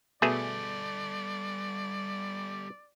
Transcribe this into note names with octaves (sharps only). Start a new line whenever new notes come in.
B2 G3 A3 G#4 A4 D5